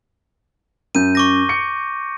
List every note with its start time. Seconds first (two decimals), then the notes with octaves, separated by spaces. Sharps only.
0.95 F#2 G6 D#7
1.15 C#6 D6 A#6
1.49 C#7